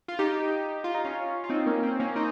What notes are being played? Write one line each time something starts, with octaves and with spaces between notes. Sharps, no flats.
F4
D#4 G4
F4
D#4
C#4 F4
F4
C4 D#4
A#3 C#4
C4
A#3 C#4
C4 D#4